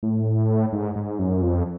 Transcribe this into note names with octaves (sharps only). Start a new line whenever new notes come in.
A2
G#2
G#2
F#2
F2